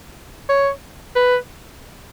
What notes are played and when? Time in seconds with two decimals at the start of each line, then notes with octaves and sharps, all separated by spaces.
0.49 C#5
1.16 B4